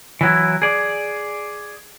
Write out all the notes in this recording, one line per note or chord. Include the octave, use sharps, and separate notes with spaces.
E3 F#3 E4
G#4 D5